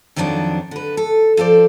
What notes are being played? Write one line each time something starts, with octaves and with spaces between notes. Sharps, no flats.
F2 D#3 F3 F#3 D4
D3 B4
A4
F3 A4 C5 D5